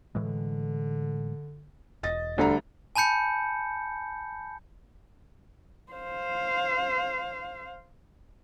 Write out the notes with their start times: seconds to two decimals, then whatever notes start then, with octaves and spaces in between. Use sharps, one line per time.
0.15 A2 D3 E3 G#3
2.03 E1 D#5 A6
2.38 D2 D3 G3 A#5
2.95 G#5 A5 B5 G6 C#7
5.92 C5 F5